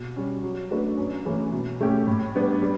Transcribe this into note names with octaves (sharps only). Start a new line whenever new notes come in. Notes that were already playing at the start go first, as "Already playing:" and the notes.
Already playing: B2
G3 C#4
F#3
A3 D4 F#4 B4
F#2
E3 A3 C#4
B2
A3 C#4 G4
A2
G3 B3 D4
G3